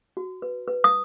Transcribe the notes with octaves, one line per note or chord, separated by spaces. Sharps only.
F#4
B4
B4
D#6